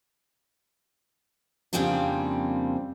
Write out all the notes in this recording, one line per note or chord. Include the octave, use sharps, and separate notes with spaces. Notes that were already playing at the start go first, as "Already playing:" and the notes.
F2 C#3 G3 A#3 C4 D4